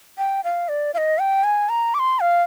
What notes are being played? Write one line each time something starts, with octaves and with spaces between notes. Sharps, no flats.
G5
F5
D5
F5
D#5
G5
G#5
A#5
D6
C6
F5